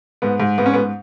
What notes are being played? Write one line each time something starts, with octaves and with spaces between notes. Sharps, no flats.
G#2 B3
G#2
G#2 B3
C#4
G#2 B3